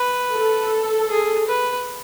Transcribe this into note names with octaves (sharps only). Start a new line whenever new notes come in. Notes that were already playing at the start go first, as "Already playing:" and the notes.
Already playing: B4
A4
G#4
B4